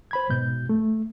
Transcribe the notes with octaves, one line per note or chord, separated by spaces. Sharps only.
C5 B5 G#6
G#2 B2 G6
A3